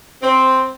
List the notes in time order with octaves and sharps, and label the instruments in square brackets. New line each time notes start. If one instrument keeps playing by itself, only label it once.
[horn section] C4